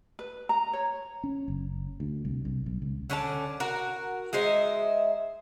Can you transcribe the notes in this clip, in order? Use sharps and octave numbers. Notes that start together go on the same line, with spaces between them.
B4
A#5
C#5
C#4
F#1
D2
C2
C2
B1
C#2
D3 C#4 D5 A5
F#4 A#4
G#3 D#4 C5 E5